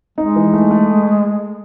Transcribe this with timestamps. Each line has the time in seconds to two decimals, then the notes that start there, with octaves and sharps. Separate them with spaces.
0.18 G#3 D#4
0.36 E3
0.54 A3
0.71 A3